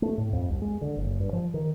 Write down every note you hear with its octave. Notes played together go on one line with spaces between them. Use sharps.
A3
A2
F2
C2
G#3
D3
F#1
G2
F3
D#3